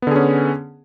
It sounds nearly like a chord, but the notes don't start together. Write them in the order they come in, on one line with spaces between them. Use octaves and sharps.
B3 D3 G#4 C#4